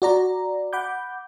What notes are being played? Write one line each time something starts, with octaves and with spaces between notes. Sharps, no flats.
F#4 D5 A#5
F#5 B5 D6 G6